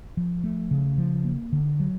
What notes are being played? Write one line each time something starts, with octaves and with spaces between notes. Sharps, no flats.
F3
A3
C#3
F3
A#3
D3
F#3